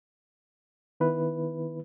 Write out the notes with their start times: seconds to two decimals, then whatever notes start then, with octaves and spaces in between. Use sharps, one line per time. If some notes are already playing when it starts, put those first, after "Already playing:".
1.00 D#3 B3 E4 B4